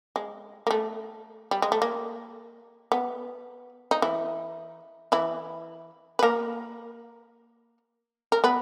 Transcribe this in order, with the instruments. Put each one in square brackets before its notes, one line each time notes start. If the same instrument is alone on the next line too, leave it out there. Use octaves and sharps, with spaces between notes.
[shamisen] G#3
A#3
A3
G3
G#3
A3
A#3
B3
D#4
E3 E4
E3 E4
B4
A#3 A#4
A#4
B3 B4